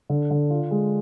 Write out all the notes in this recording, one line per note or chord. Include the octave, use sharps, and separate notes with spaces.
D3
D3
F4
G#3